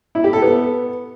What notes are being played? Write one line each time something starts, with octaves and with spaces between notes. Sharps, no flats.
E4
G4
A4
B3